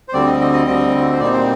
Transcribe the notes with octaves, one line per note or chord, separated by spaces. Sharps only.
C5
D2 D3 G3 C4 D5
D#5
D#5
D#5
D2 D3 G3 C4
C5
A#2 G3 C4 D#4 D5
C5